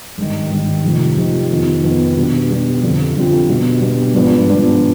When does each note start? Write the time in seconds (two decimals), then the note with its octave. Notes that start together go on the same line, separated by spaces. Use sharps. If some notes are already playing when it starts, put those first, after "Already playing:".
0.18 G#1 G2 D#3
0.51 G#1 G2 D#3
0.84 F1 F2 C3 D#3
1.17 F1 F2 C3 D#3
1.50 F2 D#3 B3 D#4
1.83 F2 D#3 B3 D#4
2.15 B2 G3 D4
2.49 B2 G3 D4
2.82 F2 D3 G3 C4 F4
3.15 F2 D3 G3 C4 F4
3.48 B2 G3 D4
3.81 B2 G3 D4
4.14 G#1 G2 F3 B3 D4
4.47 G#1 G2 F3 B3 D4